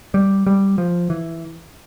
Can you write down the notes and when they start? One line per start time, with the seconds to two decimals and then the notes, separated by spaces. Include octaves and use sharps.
0.14 G3
0.46 G3
0.78 F3
1.10 E3